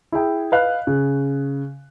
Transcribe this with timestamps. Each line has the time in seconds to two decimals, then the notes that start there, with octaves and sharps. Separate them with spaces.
0.12 E4 G#4 G5
0.52 B4 D#5 F5 F#6
0.87 C#3